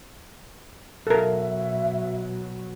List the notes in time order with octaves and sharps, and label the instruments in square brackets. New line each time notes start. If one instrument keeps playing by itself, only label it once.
[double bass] B2 F#3 [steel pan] A4 A#4 [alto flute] E5